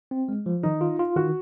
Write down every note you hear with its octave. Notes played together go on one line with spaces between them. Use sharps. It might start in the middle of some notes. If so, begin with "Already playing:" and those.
C4
G#3
F3
D#3 D#4
F4
F4
D#3 F#4